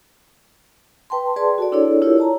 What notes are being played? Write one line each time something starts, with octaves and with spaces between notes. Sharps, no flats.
B4 G5 A5 C6
G#4 B4 D5 A5 C6
F#4 A4 D5
D4 E4 G#4 A4 C#5 D5
E4 F4 G4 A#4 C#5
C#5 A5 A#5